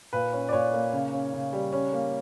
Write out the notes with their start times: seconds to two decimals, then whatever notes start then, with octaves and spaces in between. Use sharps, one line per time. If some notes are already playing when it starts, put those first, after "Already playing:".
0.13 A#2 B4
0.33 C#4
0.49 D5
0.53 A#2 C#5
0.73 A#3
0.93 C#3
1.12 C#4
1.33 C#3
1.53 G3
1.73 C#4
1.93 A#3